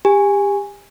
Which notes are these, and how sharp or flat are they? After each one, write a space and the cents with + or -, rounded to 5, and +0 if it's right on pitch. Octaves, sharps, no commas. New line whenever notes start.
G4 +25 G#5 -10